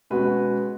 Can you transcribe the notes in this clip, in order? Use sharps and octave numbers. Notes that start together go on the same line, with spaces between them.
B2 G#3 C#4 F#4 B4